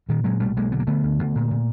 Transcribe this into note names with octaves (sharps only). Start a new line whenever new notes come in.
A#2 D#3
A#2 F#3 G#3
B1 G3 A3
B1 G#3 A#3
D3 B3
A#3
D3 A3 B3
D2
D2
A#2
A#2